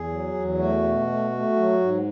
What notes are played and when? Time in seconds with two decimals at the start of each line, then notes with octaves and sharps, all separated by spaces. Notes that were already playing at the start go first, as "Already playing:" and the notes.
Already playing: E2 G#4
0.09 F#3
0.34 E2
0.58 A3 F#4
0.82 B2
1.07 A3
1.31 A3
1.56 F#3
1.80 G#2